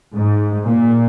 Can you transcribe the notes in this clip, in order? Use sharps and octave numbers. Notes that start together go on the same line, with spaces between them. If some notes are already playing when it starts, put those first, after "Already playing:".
G#2
A#2